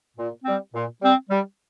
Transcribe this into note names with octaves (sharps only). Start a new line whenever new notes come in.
A#2
G3 C4
A#2
G3 C4
G3